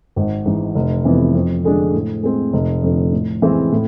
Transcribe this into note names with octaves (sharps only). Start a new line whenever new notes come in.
G#1
G#2 E3
F1
F2 C3 E3 B3
F2
D3 G#3 D4
A2
G#3 C4
F1
F2 D3
A2
E3 G#3 C4 E4
A2